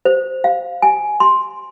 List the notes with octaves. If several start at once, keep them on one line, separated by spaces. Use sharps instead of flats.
C5
F5
G#5
C6